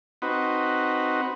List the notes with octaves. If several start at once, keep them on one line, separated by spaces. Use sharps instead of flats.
C4 D#4 F#4 B4